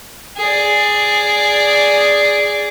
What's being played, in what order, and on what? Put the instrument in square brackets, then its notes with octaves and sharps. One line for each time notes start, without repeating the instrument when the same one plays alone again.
[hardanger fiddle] G#4 D5